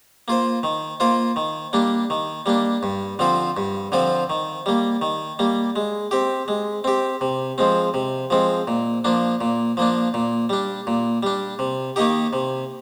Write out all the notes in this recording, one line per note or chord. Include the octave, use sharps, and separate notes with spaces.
A#3 F4 C5
D#3
A#3 F4 C5
D#3
G3 A#3 D4
D#3
G3 A#3 D4
G2
D3 F3 C4 F4
G2
D3 F3 C4 F4
D#3
G3 A#3
D#3
G3 A#3
G#3
C4 G4
G#3
C4 G4
C3
F3 G#3 C4
C3
F3 G#3 C4
A#2
F3 A#3 D4
A#2
F3 A#3 D4
A#2
G3 D4
A#2
G3 D4
C3
D#3 A#3 D#4 G4
C3